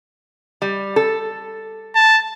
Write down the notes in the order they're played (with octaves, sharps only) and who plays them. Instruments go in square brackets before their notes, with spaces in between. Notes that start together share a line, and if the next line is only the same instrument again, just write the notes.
[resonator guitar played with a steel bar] G3
A4
[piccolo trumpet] A5